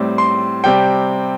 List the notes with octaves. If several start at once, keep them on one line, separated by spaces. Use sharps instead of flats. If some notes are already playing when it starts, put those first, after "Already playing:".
Already playing: A2 G3 C4
C6
C3 G3 C4 G5